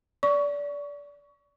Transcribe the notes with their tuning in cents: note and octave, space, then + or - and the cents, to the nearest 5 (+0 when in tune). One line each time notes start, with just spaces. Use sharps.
D5 -25 C#6 +25